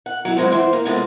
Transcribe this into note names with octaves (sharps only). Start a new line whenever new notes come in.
F#5
F#3 E4
G2 F#3 G#3 C4
F2 E3 C5 E5
A#3
C3 F3 G#3 A3 B3